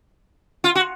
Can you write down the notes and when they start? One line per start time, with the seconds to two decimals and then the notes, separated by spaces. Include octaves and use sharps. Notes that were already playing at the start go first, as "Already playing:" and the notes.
0.64 F4
0.75 F#4